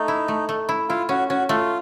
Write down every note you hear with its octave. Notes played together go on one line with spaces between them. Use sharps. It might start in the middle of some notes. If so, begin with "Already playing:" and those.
Already playing: A3 D#4
E4
A3
A3
E4
E4 F4
C#4 F#4
C#4 F#4
A3 F4